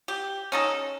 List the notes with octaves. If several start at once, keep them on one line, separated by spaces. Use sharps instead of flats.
G4
C#4 D#4 A4